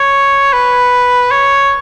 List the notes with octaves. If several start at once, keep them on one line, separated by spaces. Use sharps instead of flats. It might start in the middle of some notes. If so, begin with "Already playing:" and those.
Already playing: C#5
B4
C#5